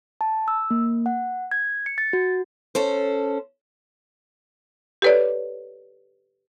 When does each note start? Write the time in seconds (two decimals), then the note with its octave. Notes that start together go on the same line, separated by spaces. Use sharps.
0.21 A5
0.48 E6
0.71 A#3
1.06 F#5
1.51 G#6
1.86 C#7
1.98 A6
2.13 F#4
2.75 C#4 A4 C5
5.02 G4 A4 B4 C#5 D5